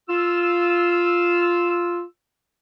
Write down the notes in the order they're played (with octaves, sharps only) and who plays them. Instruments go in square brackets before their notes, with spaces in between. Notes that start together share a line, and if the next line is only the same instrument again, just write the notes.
[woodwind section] F4 E6